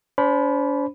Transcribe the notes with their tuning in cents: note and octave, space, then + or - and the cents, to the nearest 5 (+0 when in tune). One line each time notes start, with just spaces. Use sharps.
D4 -45 C5 -5 B5 +0